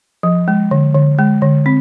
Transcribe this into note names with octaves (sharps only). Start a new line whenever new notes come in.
F3
G#3
D3
D3
G#3
D3
C4